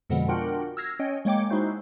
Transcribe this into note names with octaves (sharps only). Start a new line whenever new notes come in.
F2 B2 D3 F3 G#3 B3
D4 F4 F#4 A#4 F#5 G5
E6 F6 G#6 A#6 C7
C#4 C#5 D#5 G5
G#3 A#3 C#5 G5 D6
G#3 D#4 E4 F#4 C5